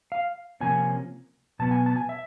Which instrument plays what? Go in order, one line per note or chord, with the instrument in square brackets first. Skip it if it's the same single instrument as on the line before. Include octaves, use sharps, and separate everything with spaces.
[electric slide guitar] F5
C3 F3 A#3 C#4 G#5
B2 F#3 B3 A5
G#5
A5
G#5
E5